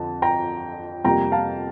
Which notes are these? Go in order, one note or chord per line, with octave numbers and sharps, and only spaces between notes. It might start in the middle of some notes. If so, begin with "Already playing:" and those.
Already playing: F2 D3 F3 A5
G5 A#5
F2 C3 G3 A#3 G5 A#5
F5 A5